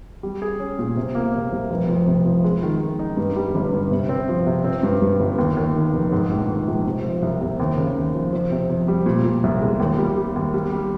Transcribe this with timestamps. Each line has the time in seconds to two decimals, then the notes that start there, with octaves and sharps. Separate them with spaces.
0.23 G3
0.42 G#4
0.60 C#4
0.79 A#2
0.97 C3
1.15 A#3
1.34 C3
1.52 C2
1.71 F1
1.89 F2
2.07 C3
2.25 F3
2.44 G#3
2.63 D#3
2.81 D#3
2.99 D#4
3.17 G2
3.36 G3
3.55 G1
3.72 G2
3.91 C3
4.09 C4
4.28 F3
4.46 C3
4.64 C4
4.83 G2
5.02 G2
5.20 G1
5.38 D#2
5.57 D#2
5.75 D#3
5.94 F1
6.12 G#2
6.31 A#1
6.49 D#3
6.68 A#1
6.86 C3
7.04 F3
7.22 C2
7.41 C3
7.59 D#2
7.78 C#3
7.96 D#2
8.14 F3
8.32 F2
8.51 C3
8.70 F2
8.88 G3
9.06 A#2
9.24 A#2
9.43 C2
9.62 G#3
9.80 D#2
9.98 G3
10.17 G3
10.36 D#2
10.54 G3
10.72 G3